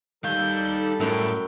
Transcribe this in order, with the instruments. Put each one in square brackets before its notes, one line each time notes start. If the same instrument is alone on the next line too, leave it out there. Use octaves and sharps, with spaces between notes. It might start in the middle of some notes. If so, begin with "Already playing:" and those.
[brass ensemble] G3 A4 [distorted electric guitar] D#4 F5 [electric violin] G6
[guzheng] F#2 [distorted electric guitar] A2 [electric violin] G5